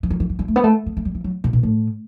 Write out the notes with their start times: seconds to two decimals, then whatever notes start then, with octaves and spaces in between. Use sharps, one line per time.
0.03 E3
0.10 F#3
0.20 E3
0.30 F#3
0.39 G3
0.48 A3
0.56 B3
0.64 A3
0.86 B3
0.97 A3
1.05 G3
1.15 E3
1.24 F#3
1.44 C3
1.53 B2
1.63 A2